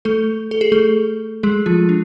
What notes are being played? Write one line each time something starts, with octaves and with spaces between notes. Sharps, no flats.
A3 A4
A4
G#4
A3 A4
G#3 G#4
F3 F4
D4